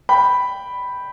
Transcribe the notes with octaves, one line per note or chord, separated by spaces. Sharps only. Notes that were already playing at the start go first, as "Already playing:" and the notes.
G5 B5